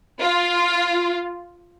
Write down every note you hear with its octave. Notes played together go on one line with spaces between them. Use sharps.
F4